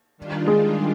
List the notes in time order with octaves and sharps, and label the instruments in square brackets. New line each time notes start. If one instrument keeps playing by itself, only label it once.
[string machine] D#3 G3 D4 F4
[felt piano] G#3